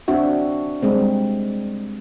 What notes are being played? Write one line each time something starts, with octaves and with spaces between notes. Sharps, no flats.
C4 D4 F#4 E5
G3 G#3 C4